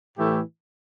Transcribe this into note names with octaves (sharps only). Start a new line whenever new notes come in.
A2 E3 A3 E4 G4